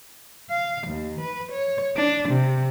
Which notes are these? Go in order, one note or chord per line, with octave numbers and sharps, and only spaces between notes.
F5
D#2
B4
C#5
D4
C3